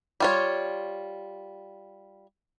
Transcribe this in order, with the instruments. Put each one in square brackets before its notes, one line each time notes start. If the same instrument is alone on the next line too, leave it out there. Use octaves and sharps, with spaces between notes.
[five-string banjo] G3 F4 C#5